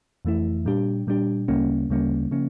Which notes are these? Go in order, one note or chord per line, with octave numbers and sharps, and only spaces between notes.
F2 E3 A3 E4
A#2 G3 D4 G4
A#2 G3 D4 G4
D2 C#3 G3 A#3 C#4
D2 C#3 G3 A#3 C#4
C#3 F3 A#3 C#4